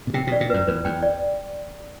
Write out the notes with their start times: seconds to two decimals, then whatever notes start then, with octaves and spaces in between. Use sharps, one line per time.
0.07 B2
0.14 C3 G5
0.27 B2 D5
0.41 A#2
0.50 F#2 B4
0.67 E2 B4
0.85 E2 G5
1.02 D5